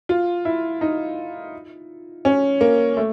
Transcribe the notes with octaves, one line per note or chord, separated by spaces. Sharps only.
F4
E4
D#4
C#4
A#3
A3